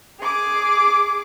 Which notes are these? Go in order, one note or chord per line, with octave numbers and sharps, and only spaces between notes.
G#4 D6